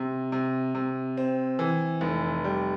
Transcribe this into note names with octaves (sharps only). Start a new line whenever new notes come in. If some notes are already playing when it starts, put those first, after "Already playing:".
Already playing: C3
C3
C3
C4
E3
F1
G3